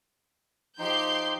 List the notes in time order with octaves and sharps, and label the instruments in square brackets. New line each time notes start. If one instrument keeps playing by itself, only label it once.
[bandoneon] F3 D#4 [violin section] G4 C6 G6